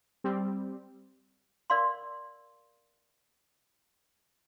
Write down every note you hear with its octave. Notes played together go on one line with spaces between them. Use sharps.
G3 C4
A#4 D5 F5 C6